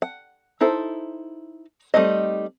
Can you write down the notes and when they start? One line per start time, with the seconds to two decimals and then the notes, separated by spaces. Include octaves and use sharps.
0.02 F#5
0.61 D#4 E4 A4 C5
1.94 G3 A3 C4 D#4 D#5